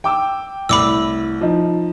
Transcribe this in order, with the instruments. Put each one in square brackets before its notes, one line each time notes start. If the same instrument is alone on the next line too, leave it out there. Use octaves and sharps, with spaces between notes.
[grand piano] G5 D6 E6
[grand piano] C2 A2 [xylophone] B5 D6 E6
[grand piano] F3 D#4